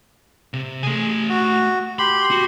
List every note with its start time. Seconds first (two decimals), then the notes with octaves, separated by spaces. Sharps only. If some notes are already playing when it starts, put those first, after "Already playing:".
0.53 C3
0.83 A3 G#4 G#5
1.29 F#4
1.99 G4 B5 C6
2.31 F#4